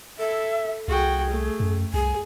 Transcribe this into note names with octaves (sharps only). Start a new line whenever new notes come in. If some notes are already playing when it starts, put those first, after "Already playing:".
A4 E5
C2 F#4 G#4 G5
A3
F#2
C2 G#4 G#5